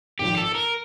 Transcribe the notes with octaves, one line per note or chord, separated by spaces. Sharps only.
G#1 G#2 F3 G4
A4
A#4